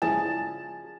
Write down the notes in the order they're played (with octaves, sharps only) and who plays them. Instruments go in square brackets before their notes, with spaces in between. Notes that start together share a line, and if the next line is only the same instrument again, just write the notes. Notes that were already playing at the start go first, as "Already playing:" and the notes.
[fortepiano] C#3 F3 E4 [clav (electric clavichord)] G#4 [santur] A5